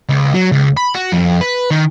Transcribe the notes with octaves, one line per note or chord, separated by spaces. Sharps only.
C#2
F#3
C#2
B5
F#4
F2
B4
D#3